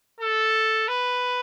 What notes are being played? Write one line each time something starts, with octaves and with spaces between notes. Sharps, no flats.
A4
B4